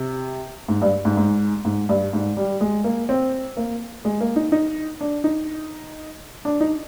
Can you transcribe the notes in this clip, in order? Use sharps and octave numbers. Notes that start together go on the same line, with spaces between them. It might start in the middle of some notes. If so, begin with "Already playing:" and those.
Already playing: C3
G#2
G2
G#2
G#2
G#2
G2
G#2
G3
G#3
A#3
C4
A#3
G#3
A#3
D#4
D#4
D4
D#4
D4
D#4